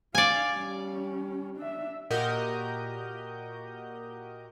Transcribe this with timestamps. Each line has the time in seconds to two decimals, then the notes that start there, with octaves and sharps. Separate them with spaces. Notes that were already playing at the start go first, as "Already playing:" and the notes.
0.15 D4 D5 F5 G#5
0.53 G3 C#4
1.57 D4 E5
2.10 A#2 F#4 G4 A#4 D#5 G6